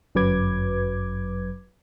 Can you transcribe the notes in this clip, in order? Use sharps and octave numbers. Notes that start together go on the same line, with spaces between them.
G1 F#2 F#3 B4 D6 G#6